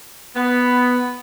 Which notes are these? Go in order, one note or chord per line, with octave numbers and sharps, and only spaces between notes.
B3